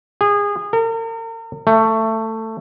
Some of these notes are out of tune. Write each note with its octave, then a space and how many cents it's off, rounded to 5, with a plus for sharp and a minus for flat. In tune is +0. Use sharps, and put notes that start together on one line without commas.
G#4 -25
A#4 -40
A3 +15